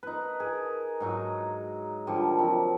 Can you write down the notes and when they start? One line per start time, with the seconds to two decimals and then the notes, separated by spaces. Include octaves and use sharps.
0.03 D#4 B4
0.40 G#4 A#4
1.00 G#2 F#3 D#4
2.07 D3 D#3 F3 G3
2.38 C3 F3 F#3